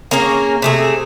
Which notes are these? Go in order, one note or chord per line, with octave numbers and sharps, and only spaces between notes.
A#3 C#4 G#4 A#4
C3 A3 G#4